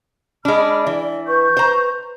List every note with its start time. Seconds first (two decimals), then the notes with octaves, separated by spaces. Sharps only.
0.45 G#3 D4 B5 F6
0.87 E3 D5
1.27 B4 C#6 G6
1.57 C5 A#5